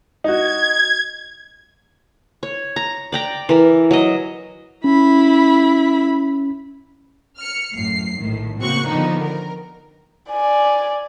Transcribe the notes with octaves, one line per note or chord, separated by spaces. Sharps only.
D#4 F#4 G#6
C#5
A#5
D5 G5 A#5
E3 A#4
F#3 D#5
C#4 E4 B5
F6 C#7
A1 F#2 A2 C7
A#1 A2 D#3
C#3 A#3 C4 F#4 C#6 F#6
D3 D#3 F3 B3 D4 D#4
A#4
D5 G#5